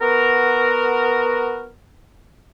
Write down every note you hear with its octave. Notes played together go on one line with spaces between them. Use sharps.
B3 F#4 A#4